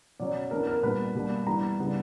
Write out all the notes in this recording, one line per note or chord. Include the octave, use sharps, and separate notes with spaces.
B2 F#3 C#4 D5
E3 B3 D4 A#4
A#4
A#2 G3 B3 D4 B4
B2 G3 A#3 D4
E3 G3 B3 D4 A#5
C#3 E3 G3 B3 D4